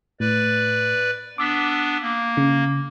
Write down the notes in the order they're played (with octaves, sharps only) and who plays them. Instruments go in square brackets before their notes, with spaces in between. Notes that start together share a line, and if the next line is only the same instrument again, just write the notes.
[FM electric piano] A2 [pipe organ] B4 D5
[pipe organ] B3 D4 [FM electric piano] D6 E6 B6
[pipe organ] A#3
[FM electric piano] C#3